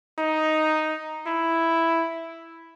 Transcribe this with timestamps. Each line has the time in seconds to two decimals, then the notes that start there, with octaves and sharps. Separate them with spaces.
0.19 D#4
1.27 E4